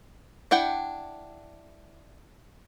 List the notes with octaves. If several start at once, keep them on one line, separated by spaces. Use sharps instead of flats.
D4 E4 F#5 G5